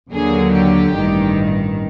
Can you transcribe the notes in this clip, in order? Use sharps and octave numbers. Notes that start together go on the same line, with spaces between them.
D#2 D3 F#3 A#3 G#4
G4
A1 G2 D#3